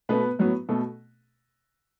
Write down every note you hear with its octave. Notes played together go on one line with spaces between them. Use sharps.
B2 A3 B3 B4
A2 F#3 B3
B2 A3 A4